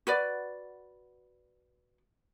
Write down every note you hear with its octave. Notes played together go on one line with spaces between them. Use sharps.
F#4 B4 D5